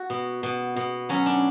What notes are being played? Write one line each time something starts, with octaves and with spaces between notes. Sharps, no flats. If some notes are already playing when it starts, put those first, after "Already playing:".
Already playing: F#4
B2
B2
B2
F#3 C#4
D4